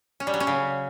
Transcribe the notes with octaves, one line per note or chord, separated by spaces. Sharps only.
C#4
G3
F#3
C#4
C#3